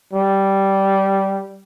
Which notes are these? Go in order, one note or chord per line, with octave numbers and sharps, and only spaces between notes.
G3